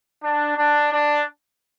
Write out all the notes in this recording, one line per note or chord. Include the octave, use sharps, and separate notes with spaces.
D4
D4
D4